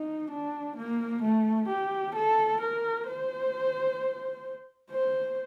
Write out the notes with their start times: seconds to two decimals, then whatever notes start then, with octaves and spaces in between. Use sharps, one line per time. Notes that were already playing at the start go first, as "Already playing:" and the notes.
Already playing: D#4
0.31 D4
0.76 A#3
1.22 A3
1.68 G4
2.15 A4
2.60 A#4
3.07 C5
4.91 C5